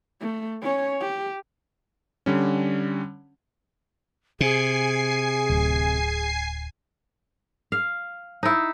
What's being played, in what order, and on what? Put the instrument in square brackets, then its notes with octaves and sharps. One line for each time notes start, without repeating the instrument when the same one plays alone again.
[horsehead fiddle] A3
C#4 C#5
G4
[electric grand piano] D3 G3 C#4
[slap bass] C3 [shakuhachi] G#4 [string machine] G#5 C7
[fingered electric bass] D1
[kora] F5
D#4 E4